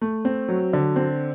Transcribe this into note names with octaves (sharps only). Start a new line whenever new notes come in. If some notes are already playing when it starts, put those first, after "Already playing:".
A3
C4
F#3
D3
C4